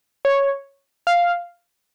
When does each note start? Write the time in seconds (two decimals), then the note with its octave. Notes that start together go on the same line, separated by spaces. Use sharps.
0.25 C#5
1.07 F5